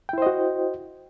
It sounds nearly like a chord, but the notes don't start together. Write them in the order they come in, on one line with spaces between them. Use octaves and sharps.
G5 E4 C5 D#5 F#4